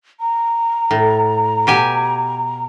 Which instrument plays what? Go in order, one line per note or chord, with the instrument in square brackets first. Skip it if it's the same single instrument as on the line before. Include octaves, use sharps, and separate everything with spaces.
[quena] A#5
[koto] A2
B2 G4 G#5